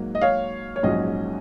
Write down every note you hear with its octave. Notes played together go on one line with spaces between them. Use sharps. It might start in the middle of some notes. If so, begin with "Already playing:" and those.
Already playing: G#2 F#3 A#3
D#5
C#5 F5
C#5
A#1 G#2 F#3 C#4 D#5